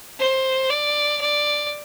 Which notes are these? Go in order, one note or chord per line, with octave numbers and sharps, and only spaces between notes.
C5
D5
D5